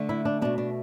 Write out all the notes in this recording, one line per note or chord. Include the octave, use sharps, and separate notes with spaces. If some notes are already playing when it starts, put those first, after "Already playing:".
Already playing: D3 A3
E4
D4
B2 A3 D4
D4